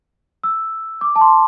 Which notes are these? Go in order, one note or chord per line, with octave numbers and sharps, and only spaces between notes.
E6
D6
A5
C6